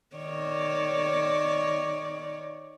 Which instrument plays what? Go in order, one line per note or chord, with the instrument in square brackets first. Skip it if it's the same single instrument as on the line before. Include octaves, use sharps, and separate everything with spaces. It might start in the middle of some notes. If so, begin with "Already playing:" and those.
[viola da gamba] D#3 C#5 D5